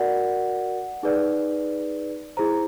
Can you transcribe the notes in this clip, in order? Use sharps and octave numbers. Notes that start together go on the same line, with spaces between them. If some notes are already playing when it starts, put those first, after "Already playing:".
Already playing: F#4 A#4 D5 F#5
D#4 G#4 B4 D5
E4 G#4 C5 A#5